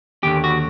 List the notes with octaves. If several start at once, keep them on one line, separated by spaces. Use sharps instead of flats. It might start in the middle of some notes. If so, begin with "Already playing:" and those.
D#2 D3 G4
F#4